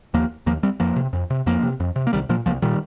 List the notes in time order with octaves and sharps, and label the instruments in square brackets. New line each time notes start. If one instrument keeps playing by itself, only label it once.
[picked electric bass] D#2 F3 A#3
D#2 F3 A#3
G3 C4
F2 F3 A#3
C3
F2
C3
F2 F3 A#3
C3
F2
C3
A#3
C2 D#3 G3
A#2 F3 A#3
C2 F3 A#3
A#2 D#3 G3